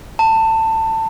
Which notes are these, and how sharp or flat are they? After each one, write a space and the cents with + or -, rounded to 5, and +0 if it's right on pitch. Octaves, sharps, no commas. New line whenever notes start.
A5 +20